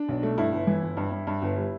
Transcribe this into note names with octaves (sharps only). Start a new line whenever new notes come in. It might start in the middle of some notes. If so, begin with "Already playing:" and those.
Already playing: D4
B1
A3
G2 E4
G1
E3
G1
G2
G2
G2
G1
G3